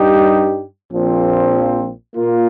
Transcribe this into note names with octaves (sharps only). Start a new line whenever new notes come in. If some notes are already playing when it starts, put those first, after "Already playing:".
Already playing: G2 G3 D#4 G4
A#1 A#2 F3 C4
A#2 A#3 F4